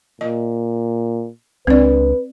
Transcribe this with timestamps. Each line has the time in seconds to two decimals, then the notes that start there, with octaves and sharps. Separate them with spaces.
0.21 A#2 D#5
1.67 C#2 C4 D4 B4 D5